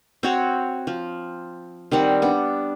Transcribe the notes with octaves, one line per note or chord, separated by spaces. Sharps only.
C4 F#4 C#5
F3
D#3 G3 C4 F#5
B3 D4